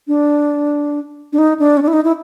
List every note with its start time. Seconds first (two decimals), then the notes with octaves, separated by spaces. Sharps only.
0.08 D4
1.33 D4
1.38 D#4
1.59 D4
1.77 C#4
1.82 D4
1.88 E4
1.93 D#4
2.04 E4